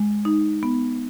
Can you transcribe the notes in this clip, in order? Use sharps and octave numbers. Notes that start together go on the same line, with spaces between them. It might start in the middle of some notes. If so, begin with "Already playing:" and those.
Already playing: G#3
D#4
B3